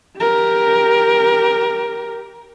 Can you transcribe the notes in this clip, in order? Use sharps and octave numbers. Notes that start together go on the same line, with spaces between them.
G4 A#4